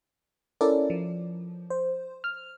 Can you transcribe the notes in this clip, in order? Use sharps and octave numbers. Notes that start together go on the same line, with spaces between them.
C#4 E4 A4 A#4 D5
F3
C5
F6